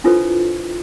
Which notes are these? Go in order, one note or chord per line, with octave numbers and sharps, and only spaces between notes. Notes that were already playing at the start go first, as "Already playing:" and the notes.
D4 E4 F4 A4 B4 C5